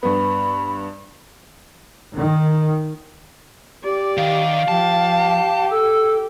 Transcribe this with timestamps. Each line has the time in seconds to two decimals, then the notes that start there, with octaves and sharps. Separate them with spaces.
0.03 G2 B3 B5
2.16 D#3
3.84 G4 D5
4.17 D#3 F5
4.68 F3 G4 A5
5.71 A4 E6